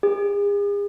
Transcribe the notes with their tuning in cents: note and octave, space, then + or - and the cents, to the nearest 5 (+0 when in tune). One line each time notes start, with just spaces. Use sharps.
G#4 -40